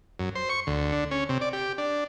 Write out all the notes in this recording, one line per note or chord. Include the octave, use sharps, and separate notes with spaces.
F#2
C5
C#6
D2
D3
C#4
C3
D5
G4
D4